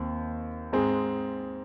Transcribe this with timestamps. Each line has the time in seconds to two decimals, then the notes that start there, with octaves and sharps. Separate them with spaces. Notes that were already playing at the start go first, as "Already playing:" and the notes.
Already playing: D#2 C4
0.73 G#2 G#3 C4